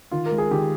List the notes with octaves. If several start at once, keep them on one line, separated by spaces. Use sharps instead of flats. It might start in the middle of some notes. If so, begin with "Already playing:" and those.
D#3 F4
A#4
G#3
G#4
D#3 G4